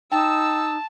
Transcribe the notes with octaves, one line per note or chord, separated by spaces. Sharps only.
D#4 G5 A5 E6